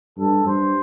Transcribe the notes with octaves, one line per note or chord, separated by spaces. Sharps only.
G2 A4
G2 C5